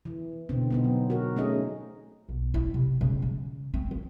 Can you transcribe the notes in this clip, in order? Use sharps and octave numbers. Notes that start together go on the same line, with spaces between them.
E3
B2 D3 C4
B3 C4 D#4
F#3
F#4 A#4
A3 C4 C#4 D#4 G#4 D#5
B1
E4
C3
C#3
C#3
C4
D#3